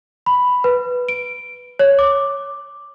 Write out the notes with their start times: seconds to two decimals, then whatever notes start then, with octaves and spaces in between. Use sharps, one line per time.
0.26 B5
0.64 B4
1.09 D7
1.79 C#5
1.99 D6